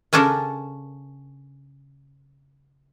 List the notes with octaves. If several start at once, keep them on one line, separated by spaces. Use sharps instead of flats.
C#3 C#4 D4 A4 A#4